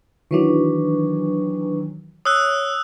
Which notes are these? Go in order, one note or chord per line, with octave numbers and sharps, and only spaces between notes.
D#3 E3 F#3 D4 B4 C#6
C#5 D#6 E6 F#6